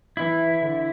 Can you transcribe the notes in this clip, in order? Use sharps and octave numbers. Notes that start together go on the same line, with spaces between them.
E3 E4
D3